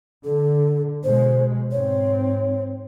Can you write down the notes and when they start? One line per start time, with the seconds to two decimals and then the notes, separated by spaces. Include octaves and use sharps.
0.25 D3 A4
1.04 B2 G#3 C5
1.72 G#2 C4 C#5